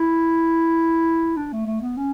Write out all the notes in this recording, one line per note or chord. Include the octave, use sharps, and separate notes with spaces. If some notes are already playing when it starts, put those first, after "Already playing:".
Already playing: E4
D4
A3
A3
B3
C#4